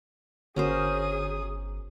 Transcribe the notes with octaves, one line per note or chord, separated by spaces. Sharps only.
G1 D3 C#4 F#4 G#4 A#4 C5 D#6